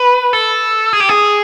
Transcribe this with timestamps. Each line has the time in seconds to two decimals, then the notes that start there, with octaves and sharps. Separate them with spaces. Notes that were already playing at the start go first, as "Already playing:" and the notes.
Already playing: B4
0.33 A4
0.93 G#4
1.00 G4
1.09 G#4